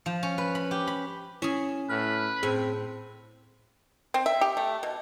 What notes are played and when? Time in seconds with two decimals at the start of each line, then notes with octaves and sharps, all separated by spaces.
0.06 F3
0.23 C#4
0.38 B4
0.55 B5
0.71 G4
0.87 B5
1.42 C#4 E4 G#4
1.89 A2 B4 F6
2.43 A2 C4 G#4
4.14 C4
4.26 E5
4.41 G4
4.57 A3
4.83 B2